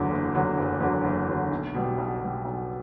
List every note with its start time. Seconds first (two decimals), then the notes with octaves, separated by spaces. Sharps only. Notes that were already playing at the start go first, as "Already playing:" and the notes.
Already playing: F#1 E2 D3 F#3
0.11 F#1
0.35 E2 D3 F#3
0.58 F#1
0.81 E2 D3 F#3
1.05 F#1
1.28 E2 D3 F#3
1.51 B1
1.74 B2 G3
1.98 B1
2.21 B2 G3
2.45 B1